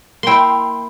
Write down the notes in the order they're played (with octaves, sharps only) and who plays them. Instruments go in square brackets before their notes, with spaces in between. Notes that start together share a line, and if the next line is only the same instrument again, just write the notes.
[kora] A#3 E4 [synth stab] G5 C6